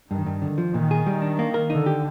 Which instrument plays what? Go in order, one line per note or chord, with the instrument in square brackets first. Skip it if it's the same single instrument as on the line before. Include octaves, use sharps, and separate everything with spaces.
[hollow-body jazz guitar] G2 [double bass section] D#3
[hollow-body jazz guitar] G2
D3
F3
[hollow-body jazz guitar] A#2 [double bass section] D#3
[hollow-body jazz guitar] G#4
G3
D4
A#3
A#4
[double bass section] D3 [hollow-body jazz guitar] D#4
[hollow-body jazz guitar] G4